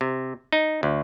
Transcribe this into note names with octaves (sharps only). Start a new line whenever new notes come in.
C3
D#4
D2